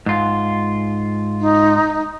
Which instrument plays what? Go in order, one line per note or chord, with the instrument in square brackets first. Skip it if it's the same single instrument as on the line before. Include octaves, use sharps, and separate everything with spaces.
[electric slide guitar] G#2 F4
[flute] D#4